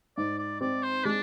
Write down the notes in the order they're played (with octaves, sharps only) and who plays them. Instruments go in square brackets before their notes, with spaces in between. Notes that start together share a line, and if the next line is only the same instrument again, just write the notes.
[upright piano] G#2 [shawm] D5
[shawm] D5
[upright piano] C4 [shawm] D5
[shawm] C5
[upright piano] G#3 [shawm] D4